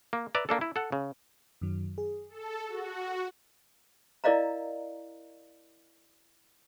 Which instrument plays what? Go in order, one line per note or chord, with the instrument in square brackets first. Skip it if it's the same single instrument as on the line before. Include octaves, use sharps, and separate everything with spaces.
[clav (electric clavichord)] A#3
B4 D5 E5 A#5
A#3 D4 A4
E4
A4 F#5
C#3
[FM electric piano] F#2 D#3 F#3
G#4
[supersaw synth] A4
F#4
[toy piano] E4 A#4 D5 D#5 F5 A#5